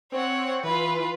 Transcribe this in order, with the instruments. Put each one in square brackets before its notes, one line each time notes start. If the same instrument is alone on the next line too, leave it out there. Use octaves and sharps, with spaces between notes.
[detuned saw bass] C4 [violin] C#5 F#5
[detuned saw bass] E3 [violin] F4 B4